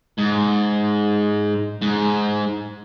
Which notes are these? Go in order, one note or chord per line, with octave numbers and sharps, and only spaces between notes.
G#2
G#2